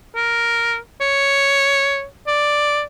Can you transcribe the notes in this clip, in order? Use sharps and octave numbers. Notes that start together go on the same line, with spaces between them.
A#4
C#5
D5